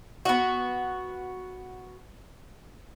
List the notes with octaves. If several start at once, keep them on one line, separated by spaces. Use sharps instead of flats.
B3 F#4